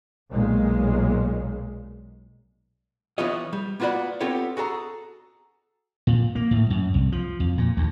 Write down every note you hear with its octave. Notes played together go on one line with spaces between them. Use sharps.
B1 A#2 G#3
E3 F3 B3 F4 C#5 D#5
G3
A#3 B3 F4 F#4 D5 B5
B3 C4 F4 G4 A4 C#5
F#4 G#4 A4 A#5
A#2
A#3
A2
F#2
C2
F3
F2
A#2
D2